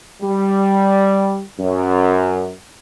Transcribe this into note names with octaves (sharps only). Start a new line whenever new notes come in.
G3
F#2